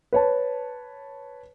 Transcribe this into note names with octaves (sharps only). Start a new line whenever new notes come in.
B4 C#5 A5